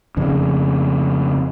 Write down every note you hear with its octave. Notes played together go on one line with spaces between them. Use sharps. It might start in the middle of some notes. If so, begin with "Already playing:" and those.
F2 C#3